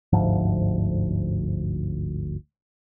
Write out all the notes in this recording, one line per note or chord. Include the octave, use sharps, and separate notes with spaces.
G1 D2 G#2 F3